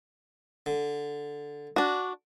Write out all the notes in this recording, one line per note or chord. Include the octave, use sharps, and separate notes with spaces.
D3
D4 F#4